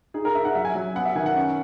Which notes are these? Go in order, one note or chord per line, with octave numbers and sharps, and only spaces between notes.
D#4 G#4
A#4
D#4 E5
F#5
F#3 E5
G#5
F#3
B3 F#5
E5
D#3 G#5
F#5
C#4